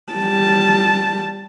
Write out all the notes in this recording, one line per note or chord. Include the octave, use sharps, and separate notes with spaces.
G3 A5